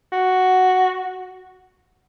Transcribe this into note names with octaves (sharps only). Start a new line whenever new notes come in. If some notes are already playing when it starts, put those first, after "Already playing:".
F#4